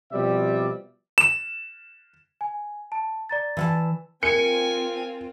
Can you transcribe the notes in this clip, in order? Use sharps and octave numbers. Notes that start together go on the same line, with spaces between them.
B2 F3 G3 C4 D5 E5
E7
G#5
A5
D5 A#5 A6
E3 F#5 A5
C4 F4 A#4 G#5 C#7